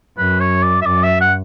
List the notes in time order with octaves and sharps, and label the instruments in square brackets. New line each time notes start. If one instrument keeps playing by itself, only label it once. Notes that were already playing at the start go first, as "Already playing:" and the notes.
[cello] F#2 [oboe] B4
[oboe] C#5
D5
E5
[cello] F#2 [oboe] D5
[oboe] E5
F#5